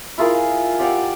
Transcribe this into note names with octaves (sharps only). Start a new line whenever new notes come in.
E4 F4 G#4 A#4
G4 D5 F5 F#5